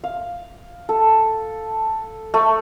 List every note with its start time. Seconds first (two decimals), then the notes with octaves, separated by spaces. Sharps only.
0.04 F5
0.89 A4
2.34 A3